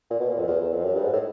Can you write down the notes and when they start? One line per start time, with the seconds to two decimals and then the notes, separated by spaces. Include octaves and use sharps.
0.11 A#2
0.20 B2
0.30 A#2
0.39 F2
0.48 E2
0.61 E2
0.73 F2
0.85 F#2
0.94 G2
1.04 G#2
1.13 A2